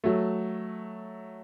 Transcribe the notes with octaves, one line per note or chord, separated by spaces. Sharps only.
F#3 A3